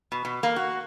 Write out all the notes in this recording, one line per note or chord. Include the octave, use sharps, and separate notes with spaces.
B2
B2
A#3
F#4